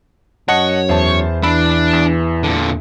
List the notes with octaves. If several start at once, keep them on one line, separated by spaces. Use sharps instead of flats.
F#2 C#5 D#5 F#5 A5
E2 C5 A5
E3 D4 B5 E6 C7
E2 E7
A#2 D3